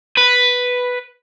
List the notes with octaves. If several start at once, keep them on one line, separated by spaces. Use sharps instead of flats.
B4